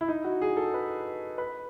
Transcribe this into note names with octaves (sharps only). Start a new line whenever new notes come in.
E4
D#4
F#4
G#4
A4
B4
B4